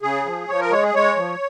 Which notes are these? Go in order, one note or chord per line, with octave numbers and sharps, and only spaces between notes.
C#3 G#4
F3
F3 C#5
A#4
G#3 C#5
G#4
G#3 C#5
F3